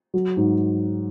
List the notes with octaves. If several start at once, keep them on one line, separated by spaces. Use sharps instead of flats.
F#3
G#2